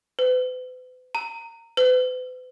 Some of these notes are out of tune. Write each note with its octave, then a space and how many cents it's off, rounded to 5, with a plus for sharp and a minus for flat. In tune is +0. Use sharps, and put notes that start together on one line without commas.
B4 +45
A#5 -25
B4 +45